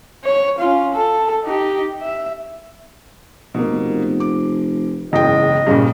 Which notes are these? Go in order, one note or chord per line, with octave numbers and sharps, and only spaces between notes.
C#5
C#4 F4
A4
D#4 G4
E5
F1 B2 A#3
D6
F#1 E2 G#2 D#5 G5
G2 A#2 C#3